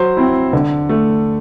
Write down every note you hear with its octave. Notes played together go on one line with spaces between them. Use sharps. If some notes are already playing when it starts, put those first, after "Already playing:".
Already playing: F#3 C5
C4 E4
D3
A3